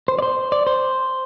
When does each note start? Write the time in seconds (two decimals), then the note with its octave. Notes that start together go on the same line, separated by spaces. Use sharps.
0.08 C5
0.19 D5
0.22 C5
0.52 D5
0.67 C5